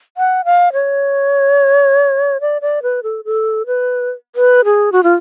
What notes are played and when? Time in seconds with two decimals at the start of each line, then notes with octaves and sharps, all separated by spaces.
0.17 F#5
0.45 F5
0.73 C#5
2.41 D5
2.62 D5
2.83 B4
3.03 A4
3.25 A4
3.67 B4
4.36 B4
4.65 G#4
4.92 F#4
5.03 F4